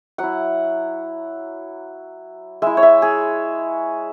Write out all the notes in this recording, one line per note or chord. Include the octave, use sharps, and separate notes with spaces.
F#3 E4 F#5
G#3 E4 E5
C#5
E5
G#4